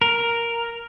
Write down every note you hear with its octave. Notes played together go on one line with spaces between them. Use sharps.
A#4